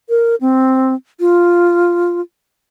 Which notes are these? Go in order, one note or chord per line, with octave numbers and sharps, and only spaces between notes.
A#4
C4
F4